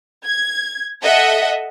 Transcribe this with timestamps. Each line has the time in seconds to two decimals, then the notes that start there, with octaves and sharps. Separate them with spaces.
0.24 G#6
1.03 A4 D#5 E5 F#5